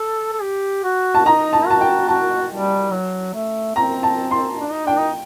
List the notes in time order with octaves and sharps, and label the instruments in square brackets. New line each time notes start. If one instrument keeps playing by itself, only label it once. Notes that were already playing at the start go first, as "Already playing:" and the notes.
Already playing: [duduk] A4
A4
G4
F#4
[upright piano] A5
[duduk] D#4 [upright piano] A#5
[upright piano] A5
[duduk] F#4 [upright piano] A5
[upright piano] G5
[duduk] F#4 [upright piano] A5
[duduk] G3
F#3
A3
[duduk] C4 [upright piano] A#5
[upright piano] A5
C6
[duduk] D4
D#4
[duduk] D4 [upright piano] G5
[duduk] D#4